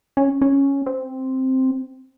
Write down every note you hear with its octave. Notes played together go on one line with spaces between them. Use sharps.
C#4
C#4
C4